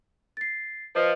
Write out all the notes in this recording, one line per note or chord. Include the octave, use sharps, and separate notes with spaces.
A6 C7
F3 B4 D#5